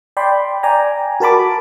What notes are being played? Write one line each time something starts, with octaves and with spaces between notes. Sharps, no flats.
D5 G5 B5 C6
D5 G5 G#5 A#5
F#4 A#4 A5 B5 D6